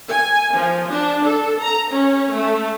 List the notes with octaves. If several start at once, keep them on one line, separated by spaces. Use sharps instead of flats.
G#5
F3
D4
A4
A#5
C#4
A3